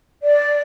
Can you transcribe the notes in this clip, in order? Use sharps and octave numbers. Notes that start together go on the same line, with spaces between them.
D5